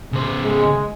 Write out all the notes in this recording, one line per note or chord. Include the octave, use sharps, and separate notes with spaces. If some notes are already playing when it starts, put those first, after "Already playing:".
C#3 C5
G#3